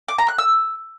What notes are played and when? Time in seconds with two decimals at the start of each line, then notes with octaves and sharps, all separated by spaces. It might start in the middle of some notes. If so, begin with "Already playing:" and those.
0.08 D6
0.18 A#5
0.28 F#6
0.38 E6